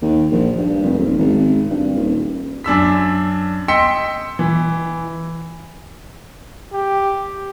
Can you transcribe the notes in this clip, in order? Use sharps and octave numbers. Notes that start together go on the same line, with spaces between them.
D#2
A#1
G2
F1
D#1
G#1
G2
D#1
F#2 D4 E6 B6
D#5 G5 C6 E6 B6 C#7
E3
G4